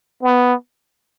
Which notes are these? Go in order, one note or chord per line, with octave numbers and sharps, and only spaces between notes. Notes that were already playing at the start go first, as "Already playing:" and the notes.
B3